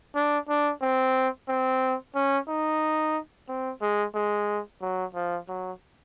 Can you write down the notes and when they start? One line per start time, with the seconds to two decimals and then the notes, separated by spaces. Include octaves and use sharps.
0.15 D4
0.49 D4
0.82 C4
1.49 C4
2.15 C#4
2.48 D#4
3.49 C4
3.82 G#3
4.15 G#3
4.82 F#3
5.15 F3
5.49 F#3